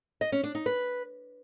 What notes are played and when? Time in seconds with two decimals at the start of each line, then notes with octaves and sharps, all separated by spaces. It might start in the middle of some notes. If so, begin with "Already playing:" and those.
0.21 D#5
0.32 C#4
0.43 D4
0.55 D#4
0.66 B4